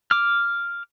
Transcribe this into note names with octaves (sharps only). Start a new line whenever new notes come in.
D6 F6